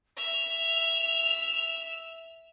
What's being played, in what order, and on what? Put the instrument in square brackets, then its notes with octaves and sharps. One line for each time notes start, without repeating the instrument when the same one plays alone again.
[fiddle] E5 [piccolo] F7